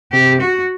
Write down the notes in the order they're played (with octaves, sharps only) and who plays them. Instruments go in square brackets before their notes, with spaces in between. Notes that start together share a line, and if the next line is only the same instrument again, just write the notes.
[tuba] C3 [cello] G4
[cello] F#4